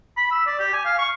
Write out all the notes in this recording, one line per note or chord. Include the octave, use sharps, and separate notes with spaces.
B5
E6
D5
G4
G#5
F5
C#6